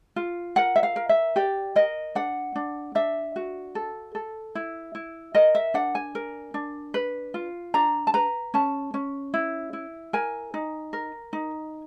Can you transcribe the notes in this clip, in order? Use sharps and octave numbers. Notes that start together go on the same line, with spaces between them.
F4
A#4 F#5
E5
F5
A#4
E5
G4 D5
A#4 D#5
D4 F#5
D4
D4 E5
F#4
A4
A4
E4
E4
A#4 D#5
E5
D4 F#5
G#5
A#4
D4
B4
F4
D4 A#5
A5
B4 A#5
C#4 A5
C#4
E4
E4
A#4 G#5
D#4
A#4
D#4